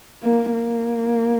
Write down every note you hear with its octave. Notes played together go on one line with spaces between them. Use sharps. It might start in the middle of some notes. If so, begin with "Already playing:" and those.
A#3
A#3